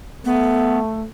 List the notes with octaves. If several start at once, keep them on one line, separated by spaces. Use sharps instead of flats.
A3 B3